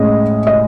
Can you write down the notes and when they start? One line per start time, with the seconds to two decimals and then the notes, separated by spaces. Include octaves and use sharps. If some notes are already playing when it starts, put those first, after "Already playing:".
Already playing: A2 G#3 C#4 D#5
0.47 D#5